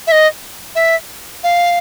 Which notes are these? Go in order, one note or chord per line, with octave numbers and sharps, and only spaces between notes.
E5
D#5
E5
F5